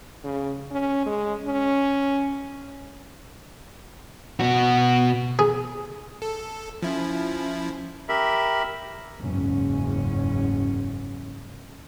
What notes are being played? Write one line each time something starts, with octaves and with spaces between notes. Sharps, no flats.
C#3
C#4
G#3
C#4
B2 F#4
G#4
A4
F3 C#4 E4
G4 A#4 E5 B5
F#1 E2 G#2 C#4